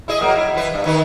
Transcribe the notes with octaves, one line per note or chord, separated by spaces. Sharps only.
E4 G#4 D#5
F#3 A#3
E4
E3 B4
G2
D#3 D#4 B4